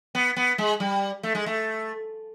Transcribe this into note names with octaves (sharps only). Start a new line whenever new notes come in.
B3
B3
G#3
G3
A3
G#3
A3